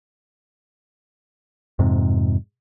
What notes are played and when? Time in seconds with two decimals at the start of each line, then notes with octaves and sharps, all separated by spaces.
1.79 F2 G#2 C3